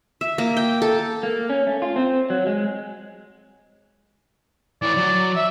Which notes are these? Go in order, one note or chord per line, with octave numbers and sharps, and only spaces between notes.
E5
A#3
G5
A4
A#3
C#4
A3
F4
C4
F#3
G#3
E3 C#5 D5
F#3
E5